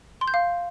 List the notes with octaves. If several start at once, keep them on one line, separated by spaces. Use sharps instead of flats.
C6
G6
F5